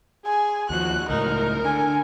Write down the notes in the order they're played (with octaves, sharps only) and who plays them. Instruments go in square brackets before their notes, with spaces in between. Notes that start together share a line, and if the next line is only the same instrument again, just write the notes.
[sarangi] G#4 [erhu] G#5
[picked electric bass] D#2 F3 [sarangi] F#4 [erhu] F#6
[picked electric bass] C#2 A2 [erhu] D#4 [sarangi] A#4
[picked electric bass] D3 [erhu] G#5